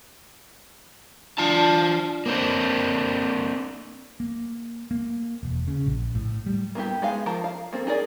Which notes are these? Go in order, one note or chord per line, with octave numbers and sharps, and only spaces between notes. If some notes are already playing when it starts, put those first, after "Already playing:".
E3 D4 F4 A5
A#3 C4 D4
A#3
A#3
E1
C#3
A#1
A2
G3
A#3 B3 E4 G4
G#3 B3 D#4 G#4 F5
F3 A#4 A5 A#5
F5
A#3 C4 A4
D#4 G#4 A#4 D5